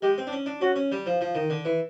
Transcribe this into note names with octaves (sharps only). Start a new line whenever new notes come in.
G#3 G4
C4
D4
C#4
D4
C#4 F#4
C#4
G3
F3
F3
D#3
D3
E3